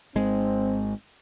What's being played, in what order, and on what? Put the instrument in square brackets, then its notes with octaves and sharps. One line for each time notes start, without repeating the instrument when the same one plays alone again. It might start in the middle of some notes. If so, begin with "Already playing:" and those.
[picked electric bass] G#1 G#3 [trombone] C4